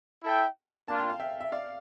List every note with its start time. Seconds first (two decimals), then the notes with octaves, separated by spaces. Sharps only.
0.24 E4 A4 E5 G5
0.88 A#3 D4 F4 A5
0.99 G5
1.10 F5
1.20 E5 G5
1.41 E5
1.52 D5 F5